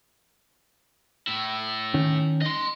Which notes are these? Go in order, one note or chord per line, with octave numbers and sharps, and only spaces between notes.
A2 E4
D#3 C#4
D#5 C6